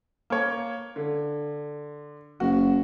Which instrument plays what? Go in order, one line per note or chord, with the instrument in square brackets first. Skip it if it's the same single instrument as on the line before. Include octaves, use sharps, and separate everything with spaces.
[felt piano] A#3 C#5
D3
[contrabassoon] F#1 [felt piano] F#4